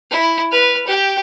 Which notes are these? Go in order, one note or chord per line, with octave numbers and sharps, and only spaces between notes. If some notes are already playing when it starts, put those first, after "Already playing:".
E4
B4 F6
G4 G5